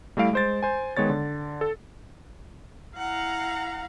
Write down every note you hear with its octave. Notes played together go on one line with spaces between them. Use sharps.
G3 A3 E4 F5 D7
G#3 C5 A6
C5 G#5
D#3 G#3 B3 C#5 A6
D3
A4
E4 F5 F#5 A#5